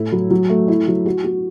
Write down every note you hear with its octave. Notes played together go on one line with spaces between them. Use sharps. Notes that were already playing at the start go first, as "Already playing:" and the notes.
Already playing: A2 E4
F#3
F#3
A3
E4
F#3
F#4
F#4